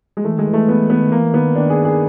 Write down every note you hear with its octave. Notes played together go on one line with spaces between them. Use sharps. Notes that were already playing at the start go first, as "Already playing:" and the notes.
G#3
E3 A3
D#3 G#3
E3
A3
B3
B3
D#3
E3 A#3
D#3 B3
D#3 D4
G#4
G#4